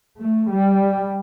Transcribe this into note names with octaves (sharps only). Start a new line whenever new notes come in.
A3
G3